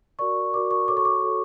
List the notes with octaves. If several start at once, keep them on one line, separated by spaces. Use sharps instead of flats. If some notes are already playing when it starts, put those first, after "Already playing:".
F#4 A#4 D5 C#6
F#4 A#4 D5 D6
C#6
F#4 A4 C#5 D6
C#6
D6
F#4 A4 C#5